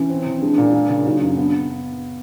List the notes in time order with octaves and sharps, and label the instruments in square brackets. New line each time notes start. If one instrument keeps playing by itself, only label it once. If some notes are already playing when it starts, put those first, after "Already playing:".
Already playing: [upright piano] E3 [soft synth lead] C#4
[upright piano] C4
E3
[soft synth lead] C#4
[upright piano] G#3 [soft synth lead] D4
[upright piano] A#2
A#3
C#3
[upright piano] F#3 [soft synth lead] D#4
[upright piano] F#2 [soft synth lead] D4
[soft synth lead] C#4
[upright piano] B3 [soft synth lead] D4